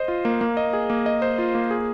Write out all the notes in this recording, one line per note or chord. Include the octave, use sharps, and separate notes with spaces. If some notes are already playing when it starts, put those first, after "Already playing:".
Already playing: C5 D#5
F4
A#3
A#3
D#5
G#4
A#3
D#5
C5
F4
A#3
G#4